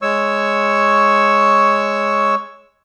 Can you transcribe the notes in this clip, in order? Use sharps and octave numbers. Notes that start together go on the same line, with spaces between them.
G#3 C#5 C#6 E6